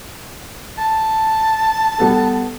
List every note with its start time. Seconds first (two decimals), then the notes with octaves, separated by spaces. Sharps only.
0.78 A5
1.98 G3 B3 A4